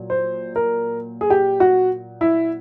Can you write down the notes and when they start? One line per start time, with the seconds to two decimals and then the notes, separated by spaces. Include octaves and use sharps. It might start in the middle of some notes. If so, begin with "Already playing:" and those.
Already playing: A#2 F#3
0.10 C5
0.56 A#4
1.21 G#4
1.30 G4
1.60 F#4
2.21 E4